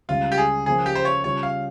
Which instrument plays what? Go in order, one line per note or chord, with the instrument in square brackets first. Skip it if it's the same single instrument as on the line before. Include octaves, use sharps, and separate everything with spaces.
[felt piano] C#2 C#3 G3 [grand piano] F4
[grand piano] G4
G#4
[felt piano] C#3 F3 A#3 [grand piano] G#4
[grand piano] G4
C5
C#5
[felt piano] C#3 G3 C#4 F4 [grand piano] C#5
[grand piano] F5